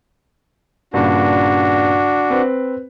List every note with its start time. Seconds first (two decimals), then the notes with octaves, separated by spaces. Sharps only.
0.94 G2 A#2 C#3 D4 F#4
2.30 C4 B4